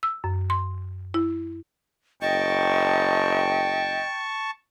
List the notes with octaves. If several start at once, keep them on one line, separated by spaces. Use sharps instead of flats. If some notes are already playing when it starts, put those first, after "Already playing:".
E6
F#2
C6
E4
F#1 D#5 G5 A5 C#6